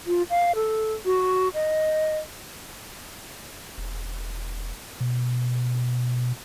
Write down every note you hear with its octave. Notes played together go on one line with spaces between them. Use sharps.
F4
F5
A4
F#4
D#5
E1
B2